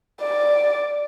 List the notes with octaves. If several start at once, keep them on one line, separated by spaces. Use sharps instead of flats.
D5